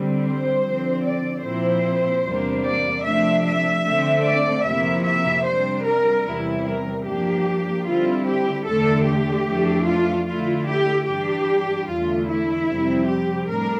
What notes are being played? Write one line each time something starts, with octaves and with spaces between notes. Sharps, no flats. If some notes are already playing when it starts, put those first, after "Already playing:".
Already playing: D3 G3 C4
C5
D3 F3 C4
D5
A#2 F3 C4 E4 C5
E2 C3 G3 A#3 D4
D5
C3 F3 A3 D4 E5
E5
D3 A3 C4
D5
F2 C3 F3 A#3 E4 E5
E5
C3 G3 D4 C5
A#4
E2 C3 E3 G3 E4
A#4
G2 F3 A#3 D4 G4
D3 G3 C4 E4 F4
G4
E2 D3 A3 D4 A4
G4
F2 E3 A3 D4
F4
D3 A3 E4 F4
G4
G2 E3 G3 D4 G4
E2 D3 A3 F4
E4
F2 C3 G3 C4
G4
A2 G3 D4 A#4